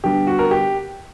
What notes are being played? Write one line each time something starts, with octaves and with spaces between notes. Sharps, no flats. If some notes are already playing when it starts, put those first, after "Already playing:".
D3 G3 B3 D4 G4
F#4
A#4
G4